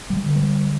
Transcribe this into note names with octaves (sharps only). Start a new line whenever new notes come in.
G3
D3
G3